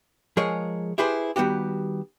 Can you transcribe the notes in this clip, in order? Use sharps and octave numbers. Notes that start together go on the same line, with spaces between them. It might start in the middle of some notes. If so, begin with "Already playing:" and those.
F3 G#3 G#4 A#4 C#5 D#5
E4 G4 G#4 B4 C5
D#3 G3 B3 F#4 G4